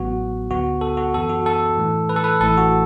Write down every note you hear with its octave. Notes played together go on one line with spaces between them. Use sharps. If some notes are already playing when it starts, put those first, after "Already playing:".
Already playing: A1 A2 F#3 B3 F#4
D2 D3 B3 F#4
A4
F#4
F#2 E3 B3 A4
F#4
A4
A2 E3 A3
B4
A4
B4
A1 A2 E3 A3 A4
F#4